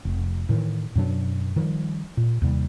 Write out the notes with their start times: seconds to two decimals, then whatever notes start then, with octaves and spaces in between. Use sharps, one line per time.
0.05 F1
0.49 A2 D#3 E3
0.96 F#2 B2 F#3 D4
1.56 D#3 F3 G3
2.17 A#2
2.42 D#2 C3 G3